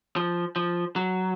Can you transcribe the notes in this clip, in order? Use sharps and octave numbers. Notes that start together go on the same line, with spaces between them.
F3
F3
F#3